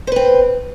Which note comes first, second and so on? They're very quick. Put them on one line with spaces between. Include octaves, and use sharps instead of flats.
C5 B4 C4